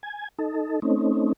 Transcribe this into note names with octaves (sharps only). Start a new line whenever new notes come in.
G#5
D#4 A4
A3 C4 C#4 D#4